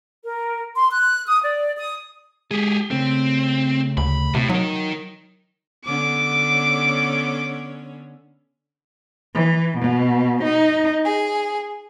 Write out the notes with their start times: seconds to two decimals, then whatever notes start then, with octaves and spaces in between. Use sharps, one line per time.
0.24 A#4
0.76 C6
0.91 F#6
1.28 D#6
1.43 D5
1.77 D#6
2.51 G#3 G4 G#4
2.91 C#3 A3 C4
3.97 D2 B5
4.35 A2 C3
4.49 F#3 D#4 A#4
5.86 D3 B3 C#4 D6
9.36 E3
9.79 B2
10.45 D#4
11.05 G#4